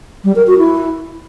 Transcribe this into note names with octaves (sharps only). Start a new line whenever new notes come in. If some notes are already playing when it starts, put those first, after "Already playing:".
G3
A#4
F#4
E4